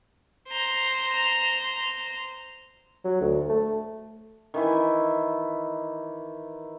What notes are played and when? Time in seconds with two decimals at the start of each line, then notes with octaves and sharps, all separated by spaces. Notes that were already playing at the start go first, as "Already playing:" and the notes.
0.48 C5 A#5
3.04 F#3
3.21 D2
3.49 A3
4.54 D#3 E3 E4